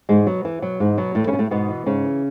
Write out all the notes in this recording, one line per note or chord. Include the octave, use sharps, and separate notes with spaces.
E2 G#2 G#3
B2 F#3
E2 E3
B2 F#3
E2 G#2 G#3
B2 F#3
E2 A2 A3
C#3 C#4
B2
A2 A3
G#2 B2 B3
E3
G#2 C#3 C#4
E3